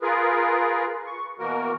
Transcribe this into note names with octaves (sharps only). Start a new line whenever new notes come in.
F4 G#4 A#4 B4
C#6
B2 E3 A#3 F#4 A#4